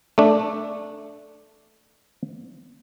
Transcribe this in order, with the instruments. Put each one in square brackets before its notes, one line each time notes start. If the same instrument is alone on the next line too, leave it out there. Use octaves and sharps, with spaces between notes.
[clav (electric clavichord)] A3 D4